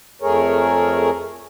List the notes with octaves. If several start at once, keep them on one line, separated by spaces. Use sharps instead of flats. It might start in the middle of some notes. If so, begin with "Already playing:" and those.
F2 A3 G#4 A#4 C#5